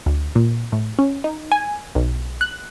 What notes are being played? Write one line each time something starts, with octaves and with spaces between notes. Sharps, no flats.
D2
A#2
A2
C#4
D#4
G#5
B1
F#6